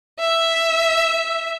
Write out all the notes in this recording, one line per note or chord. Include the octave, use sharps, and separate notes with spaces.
E5